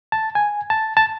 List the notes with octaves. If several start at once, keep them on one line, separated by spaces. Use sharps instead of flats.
A5
G#5
A5
A5